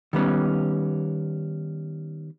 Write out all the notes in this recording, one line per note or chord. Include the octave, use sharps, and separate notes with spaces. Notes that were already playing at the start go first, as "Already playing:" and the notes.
D#3 G3 B3 C#4